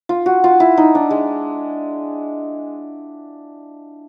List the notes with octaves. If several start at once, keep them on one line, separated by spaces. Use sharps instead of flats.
F4
F#4
F4
E4
D#4
D4
G#3